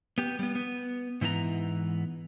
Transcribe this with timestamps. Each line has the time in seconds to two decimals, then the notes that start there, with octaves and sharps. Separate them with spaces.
0.18 B3 G4
0.39 G3 B3
0.55 B3
1.21 G#2 E3 B3 G4 A#5